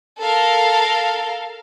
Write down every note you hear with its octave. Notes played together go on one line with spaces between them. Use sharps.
A4 A#4 F5